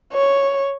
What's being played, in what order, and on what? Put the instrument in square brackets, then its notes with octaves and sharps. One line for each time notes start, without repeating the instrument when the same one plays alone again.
[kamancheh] C#5